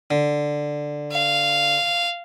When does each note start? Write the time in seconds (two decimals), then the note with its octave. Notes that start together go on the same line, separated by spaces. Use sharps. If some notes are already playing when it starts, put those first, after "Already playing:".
0.11 D3
1.12 F5